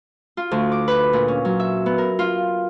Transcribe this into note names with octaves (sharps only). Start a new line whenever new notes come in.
F4
D2
D6
B4
A#2
C#4
F#3
E5
B3
A#4
F4